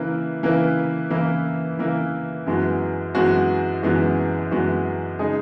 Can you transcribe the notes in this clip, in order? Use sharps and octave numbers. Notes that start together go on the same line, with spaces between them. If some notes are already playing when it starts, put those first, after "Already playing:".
Already playing: C#3 E3 A#3 E4 B4
C#3 E3 A#3 E4 B4
C#3 E3 A#3 E4 B4
C#3 E3 A#3 E4 B4
F#2 E3 G#3 B3 F#4
F#2 E3 G#3 B3 F#4
F#2 E3 G#3 B3 F#4
F#2 E3 G#3 B3 F#4
C#3 G#3 D#4 G#4